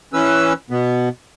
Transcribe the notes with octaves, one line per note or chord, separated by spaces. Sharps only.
E3 C#4 B4 E6
B2 B3